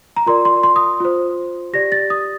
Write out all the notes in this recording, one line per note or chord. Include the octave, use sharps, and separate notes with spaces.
A#5
F4 A#4 D5 C6
C6
C6
D#6
F4 C5
G4 D5 A#6
A6
D#6